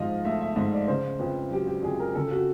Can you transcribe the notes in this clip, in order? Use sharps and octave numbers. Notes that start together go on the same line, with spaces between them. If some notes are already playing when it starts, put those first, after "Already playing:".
Already playing: G#2 F3 D#5 F5
A3 E5
E5
G#2 D#5
D5
C#3 C5
F2 B4
F#3 G4
G4
F2 G#4
A#4
C#3 A4
F#4